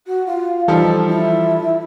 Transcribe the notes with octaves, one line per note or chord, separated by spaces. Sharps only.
F#4
F4
E3 F3 G3 D#4 A4
E4